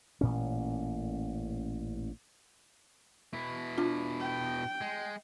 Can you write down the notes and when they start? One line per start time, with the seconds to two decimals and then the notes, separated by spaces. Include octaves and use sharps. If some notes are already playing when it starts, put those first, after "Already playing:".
0.21 A1 A#2 C#4
3.33 B2 E4
3.78 D4 F4
4.20 G5
4.81 G#3